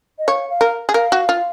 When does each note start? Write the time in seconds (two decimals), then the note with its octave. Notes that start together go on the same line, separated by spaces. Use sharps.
0.18 D#5
0.28 C#5 F5
0.49 F5
0.61 A#4
0.89 G#4
0.94 A#4 F5
1.12 F#4
1.29 F4